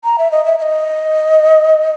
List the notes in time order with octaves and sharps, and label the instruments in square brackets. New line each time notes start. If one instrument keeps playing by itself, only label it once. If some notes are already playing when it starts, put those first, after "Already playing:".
[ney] A#5
E5
D#5
E5
E5
D#5